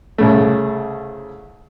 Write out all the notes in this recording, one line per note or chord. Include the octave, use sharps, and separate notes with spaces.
C2 C#3 A3